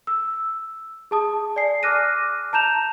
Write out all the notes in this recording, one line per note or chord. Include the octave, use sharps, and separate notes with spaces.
E6
G#4 A5 D#6
D5 G#5 C7
D6 F6 F#6 A#6 D#7
A5 A#5 G6 E7 F7